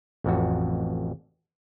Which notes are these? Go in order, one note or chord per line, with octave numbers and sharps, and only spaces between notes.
A1 F2 F#4